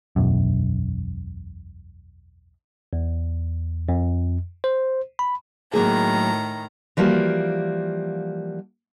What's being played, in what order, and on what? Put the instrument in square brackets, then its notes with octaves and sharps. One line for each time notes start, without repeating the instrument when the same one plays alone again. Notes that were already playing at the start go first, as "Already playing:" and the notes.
[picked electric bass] E1 B1 F#2
[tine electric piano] E2
F2
C5
B5
[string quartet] A2 D#3 A#5 [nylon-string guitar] F#3 A#3 G#4
[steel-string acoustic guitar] E3 F3 G3 A#3 F#4